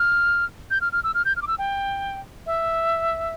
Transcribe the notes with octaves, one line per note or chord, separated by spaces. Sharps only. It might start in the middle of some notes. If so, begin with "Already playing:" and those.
Already playing: F6
G6
F6
F6
E6
F6
G6
F6
D6
E6
G5
E5